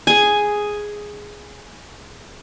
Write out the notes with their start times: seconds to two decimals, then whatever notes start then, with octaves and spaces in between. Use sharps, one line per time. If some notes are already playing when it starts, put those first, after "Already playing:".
0.07 G#4 G#5